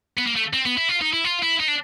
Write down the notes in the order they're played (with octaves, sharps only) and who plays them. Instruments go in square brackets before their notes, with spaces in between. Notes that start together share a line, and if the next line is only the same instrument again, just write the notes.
[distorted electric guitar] B3
A#3
A3
C4
B3
E4
F4
D#4
E4
F4
E4
D#4
D4